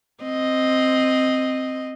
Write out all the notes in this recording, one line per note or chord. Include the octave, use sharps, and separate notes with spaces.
C4 D#5